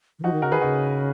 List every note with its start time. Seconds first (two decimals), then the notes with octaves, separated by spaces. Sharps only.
0.19 D#3
0.23 F3 D#4 F#4
0.33 D#3
0.42 C#3 F#4 A#4
0.52 D#3 G#4 B4
0.61 C#3 D#4 F#4